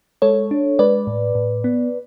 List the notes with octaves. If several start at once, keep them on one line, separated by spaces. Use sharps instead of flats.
G#3 A4 C#5
D4
G#3 B4 D5
A2
A2
B3